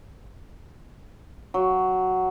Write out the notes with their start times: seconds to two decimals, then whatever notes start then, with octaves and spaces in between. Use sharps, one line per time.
1.54 F#3